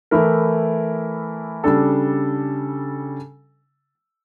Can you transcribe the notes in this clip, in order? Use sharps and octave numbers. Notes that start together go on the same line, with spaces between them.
E3 A3 E4 A#4
C#3 G3 D4 A4